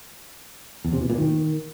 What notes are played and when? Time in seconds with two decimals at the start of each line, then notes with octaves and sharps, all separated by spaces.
0.84 E2
0.93 C3
1.01 B2
1.10 A#2
1.18 D#3